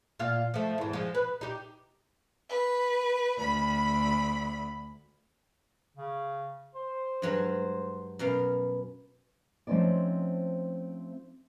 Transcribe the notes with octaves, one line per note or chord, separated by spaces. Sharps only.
A#2 F4 F5
F3 A3
E2 G#2
F3 G#3
B4
D#4 G4
B4
D2 B5
C#3
C5
G2 F#3 G#3
F#2 B2 F5
F3 A3 C4 C#4 D#4 D5